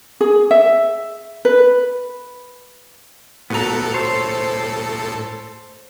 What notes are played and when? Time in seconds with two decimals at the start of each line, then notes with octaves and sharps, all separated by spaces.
0.21 G#4
0.51 E5
1.45 B4
3.50 A2 B3 F#4 A4 A#5
3.94 C5 C#5